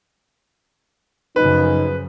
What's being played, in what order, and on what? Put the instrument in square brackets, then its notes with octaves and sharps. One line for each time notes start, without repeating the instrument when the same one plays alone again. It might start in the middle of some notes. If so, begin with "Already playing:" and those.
[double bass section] F#2 C#3 F3 [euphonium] D#4 [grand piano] B4